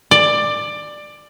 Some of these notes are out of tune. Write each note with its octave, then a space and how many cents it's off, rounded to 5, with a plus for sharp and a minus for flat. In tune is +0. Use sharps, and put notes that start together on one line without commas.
D5 +15